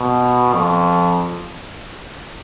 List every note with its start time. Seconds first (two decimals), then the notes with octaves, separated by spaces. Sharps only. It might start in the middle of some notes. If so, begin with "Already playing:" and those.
Already playing: B2
0.54 F2